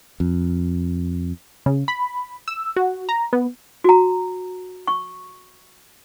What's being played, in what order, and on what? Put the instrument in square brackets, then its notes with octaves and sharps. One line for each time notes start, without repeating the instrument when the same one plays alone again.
[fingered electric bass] F2
[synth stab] C#3
B5
E6
F#4
A#5
B3
[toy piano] F#4 A#5
C#6